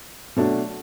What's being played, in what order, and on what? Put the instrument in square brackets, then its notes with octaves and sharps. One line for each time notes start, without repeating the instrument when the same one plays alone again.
[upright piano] B2 F#3 A3 D4